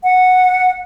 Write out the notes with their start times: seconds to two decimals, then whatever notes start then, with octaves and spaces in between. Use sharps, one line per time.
0.04 F#5